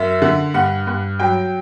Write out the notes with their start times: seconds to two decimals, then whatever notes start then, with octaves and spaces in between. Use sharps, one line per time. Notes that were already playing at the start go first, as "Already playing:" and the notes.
Already playing: F#2 E5
0.22 D3
0.54 G2 F#5
0.87 G2
1.19 F#3 G5